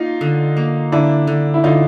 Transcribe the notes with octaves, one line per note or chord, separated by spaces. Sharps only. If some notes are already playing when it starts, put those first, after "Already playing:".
Already playing: A#3 D#4 F4
D3
A#3
D3 D4 E4
D3
E4
D3 D#4 F4